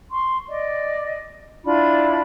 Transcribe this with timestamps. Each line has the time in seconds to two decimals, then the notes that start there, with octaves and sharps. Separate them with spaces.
0.11 C6 C#6
0.49 D5 D#5
1.64 D4 E4 F4 B5